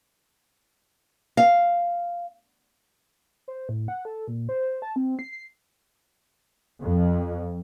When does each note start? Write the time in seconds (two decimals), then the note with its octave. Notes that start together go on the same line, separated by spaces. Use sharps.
1.37 F5
3.48 C5
3.69 A2
3.88 F#5
4.05 A4
4.28 A#2
4.49 C5
4.82 A5
4.96 C4
5.19 C7
5.32 C7
6.82 F2